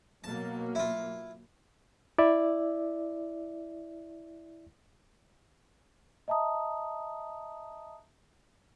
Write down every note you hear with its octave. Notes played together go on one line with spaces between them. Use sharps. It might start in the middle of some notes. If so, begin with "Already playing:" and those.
B2 F#3 A#3 A5
E4 F4
E4 D5 E5
D#5 E5 A5 A#5 D#6